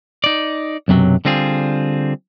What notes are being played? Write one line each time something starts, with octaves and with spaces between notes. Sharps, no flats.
D#4 D5
B1 F#2 C3 F#3
D3 G3 C4 F4 G#4